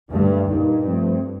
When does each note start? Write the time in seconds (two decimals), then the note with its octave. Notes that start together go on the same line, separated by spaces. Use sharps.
0.11 G2 D3 A3 D4
0.49 G2 A#2 G3 A#3 D#4
0.86 F3 A3 C4